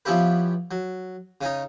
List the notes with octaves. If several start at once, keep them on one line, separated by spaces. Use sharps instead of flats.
F3 B3 C#4 E4 G4 B4
F#3
C#3 C#4 D#4